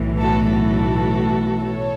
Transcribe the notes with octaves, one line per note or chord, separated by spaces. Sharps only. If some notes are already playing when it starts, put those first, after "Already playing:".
Already playing: B1 A2 E3
F#4 A4
F#4 A4
A4 C#5